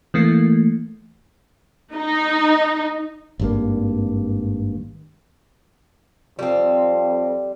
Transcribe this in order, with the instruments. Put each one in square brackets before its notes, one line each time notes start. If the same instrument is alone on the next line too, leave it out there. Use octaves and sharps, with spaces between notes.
[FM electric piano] E3 A3 A#3
[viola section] D#4
[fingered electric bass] G#1 G2 A#3
[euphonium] F2 [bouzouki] G3 C4